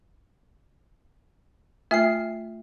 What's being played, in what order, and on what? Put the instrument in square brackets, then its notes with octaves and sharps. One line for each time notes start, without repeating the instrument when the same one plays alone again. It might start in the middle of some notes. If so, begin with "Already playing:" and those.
[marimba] A3 F4 G#5 [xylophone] E5 F6 C7